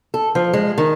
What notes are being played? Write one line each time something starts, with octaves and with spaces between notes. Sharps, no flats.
A4
F3
G#3
D#3